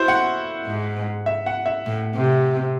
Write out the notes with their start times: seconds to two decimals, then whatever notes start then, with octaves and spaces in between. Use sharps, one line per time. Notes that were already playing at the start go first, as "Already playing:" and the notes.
Already playing: E4 F#4 C5
0.08 F#5
0.66 G#2
1.26 E5
1.46 F#5
1.66 E5
1.86 A2
2.16 C3